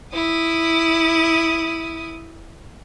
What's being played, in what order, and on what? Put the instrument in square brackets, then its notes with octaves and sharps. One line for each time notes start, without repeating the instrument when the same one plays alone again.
[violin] E4 D#6